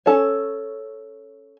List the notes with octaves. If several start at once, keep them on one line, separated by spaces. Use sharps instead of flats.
C#4 A4 C#5